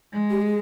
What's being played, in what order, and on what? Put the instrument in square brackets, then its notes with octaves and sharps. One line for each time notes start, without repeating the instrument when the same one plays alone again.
[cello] G#3
[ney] G4
G#4